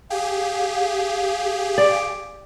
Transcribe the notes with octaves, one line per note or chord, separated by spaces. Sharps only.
G4 G#4 F5
D5